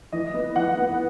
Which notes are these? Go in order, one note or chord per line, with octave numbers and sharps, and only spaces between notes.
E3 D#5
B3
E3 F#5
B3